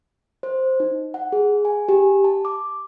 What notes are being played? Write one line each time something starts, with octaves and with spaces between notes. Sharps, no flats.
C5
D#4
F#5
G#4
G#5
G4
A5
D6